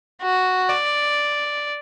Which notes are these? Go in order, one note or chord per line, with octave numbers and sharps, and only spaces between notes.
F#4
D5